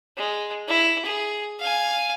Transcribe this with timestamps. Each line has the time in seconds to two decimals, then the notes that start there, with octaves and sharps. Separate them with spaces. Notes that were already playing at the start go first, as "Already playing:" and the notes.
0.17 G#3
0.68 E4
1.05 G#4
1.60 F5 G#5